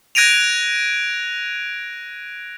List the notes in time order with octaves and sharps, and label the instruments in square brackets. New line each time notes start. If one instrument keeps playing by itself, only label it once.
[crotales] F#6 G#6 A#6 D7 D#7 F7